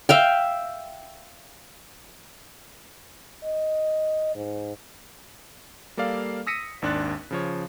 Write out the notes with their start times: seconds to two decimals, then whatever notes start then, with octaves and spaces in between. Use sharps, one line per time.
0.09 E5 F5 G5
3.44 D#5
4.35 G#2
5.97 G3 A#3 A4 D5 F5
6.47 D#6 E6 A#6 B6 C#7 D#7
6.82 G#1 D#2 D4 C6 F#6 A6
7.31 C#3 F3 C#5